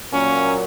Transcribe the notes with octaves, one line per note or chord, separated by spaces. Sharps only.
A#2 F#3 A#3 C#4